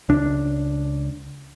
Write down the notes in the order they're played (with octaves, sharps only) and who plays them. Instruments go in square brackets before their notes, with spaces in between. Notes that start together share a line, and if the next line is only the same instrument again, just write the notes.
[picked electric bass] C#2 D4